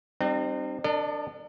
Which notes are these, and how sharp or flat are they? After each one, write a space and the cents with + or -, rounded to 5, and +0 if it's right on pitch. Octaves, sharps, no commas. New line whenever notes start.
G3 +0 C4 +0 D#4 -45
D4 +0 A#4 -45 D#5 -40